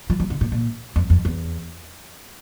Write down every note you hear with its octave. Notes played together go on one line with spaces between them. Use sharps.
F3
F3
D3
A#2
A#2
F2
F2
E2